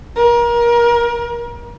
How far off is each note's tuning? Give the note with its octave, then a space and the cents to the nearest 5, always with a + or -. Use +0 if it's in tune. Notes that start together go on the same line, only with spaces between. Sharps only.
A#4 +30